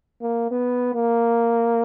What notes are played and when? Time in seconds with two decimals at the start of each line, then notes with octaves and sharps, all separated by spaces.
0.22 A#3
0.51 B3
0.94 A#3